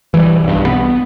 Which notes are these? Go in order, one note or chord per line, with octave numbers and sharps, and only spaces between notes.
E3 G3
B1 G2
B3